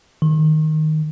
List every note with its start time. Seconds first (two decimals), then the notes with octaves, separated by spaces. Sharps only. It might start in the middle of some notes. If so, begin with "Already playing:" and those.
0.22 D#3